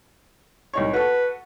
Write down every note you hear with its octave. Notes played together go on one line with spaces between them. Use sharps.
C2 D#4 C#5
F#4 A4 B4